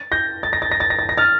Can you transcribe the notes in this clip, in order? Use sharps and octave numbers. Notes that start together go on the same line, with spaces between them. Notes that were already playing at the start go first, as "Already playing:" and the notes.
Already playing: A6
G6 A#6
A6
A#6
A6
A#6
A6
A#6
A6
A#6
F6 A6